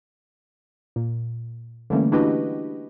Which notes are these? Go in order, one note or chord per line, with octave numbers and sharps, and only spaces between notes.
A#2
D3 E3 G3 A3 A#3 C#4
D4 E4 F#4 G4 B4 D#5